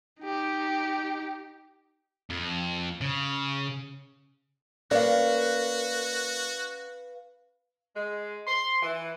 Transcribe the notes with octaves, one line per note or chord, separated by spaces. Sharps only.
D#4 G4
F2
C#3
A#3 C#4 F#4 B4 D5 F5
G#3
C6
E3